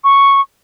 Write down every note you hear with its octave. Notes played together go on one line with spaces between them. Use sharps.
C#6